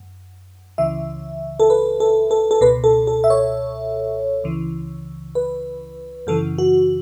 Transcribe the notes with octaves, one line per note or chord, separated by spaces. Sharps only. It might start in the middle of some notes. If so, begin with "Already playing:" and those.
Already playing: F#2
C#2 C#3 E3 E5
A4
B4
A4
A4
A4
C#2 B2 B4
A4
A4
E5
C#5
C#2 C#3 E3
B4
F#2 C#3 E3 A4
F#4